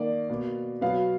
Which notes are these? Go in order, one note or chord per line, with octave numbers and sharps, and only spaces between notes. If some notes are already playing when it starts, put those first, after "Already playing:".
Already playing: D#3 A#3 D5
B2 A#3
B2 F#3 B3 F5